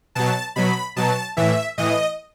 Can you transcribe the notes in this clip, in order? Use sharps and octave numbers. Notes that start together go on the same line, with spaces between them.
B2 F#3 A5
B2 F#3 B5
B2 F#3 A5
A2 E3 E5
A2 E3 D#5